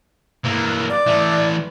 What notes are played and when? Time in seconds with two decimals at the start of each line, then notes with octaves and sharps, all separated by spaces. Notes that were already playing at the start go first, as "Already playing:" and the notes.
0.44 E3 A#3
0.90 D5
1.07 E3 A3